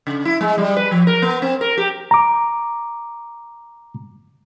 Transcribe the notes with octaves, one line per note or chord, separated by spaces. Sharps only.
C#3
E4
G#3
G3
B4
F3
A#4
B3
C4
A#4
G4
A#5 D6